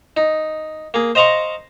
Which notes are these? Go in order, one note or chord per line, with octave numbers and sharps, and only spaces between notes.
D#4
A#3 G#4
C5 D#5 F5 A#5 C6 C#6